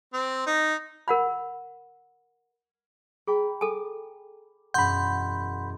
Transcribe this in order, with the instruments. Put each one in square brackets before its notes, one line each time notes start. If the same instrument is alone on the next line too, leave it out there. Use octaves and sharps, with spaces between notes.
[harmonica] C4
D#4
[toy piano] A#4 F#5 B5
[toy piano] G#4 [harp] G5 A#5 B5
[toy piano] A4 G#5 [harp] D6
[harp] E1 F#2 [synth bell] F#5 C6 [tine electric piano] B5 G6